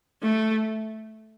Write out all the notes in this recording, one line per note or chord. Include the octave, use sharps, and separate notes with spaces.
A3